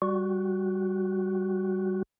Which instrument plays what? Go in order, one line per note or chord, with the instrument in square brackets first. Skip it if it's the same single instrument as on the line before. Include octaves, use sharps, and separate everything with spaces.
[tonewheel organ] G3 F#4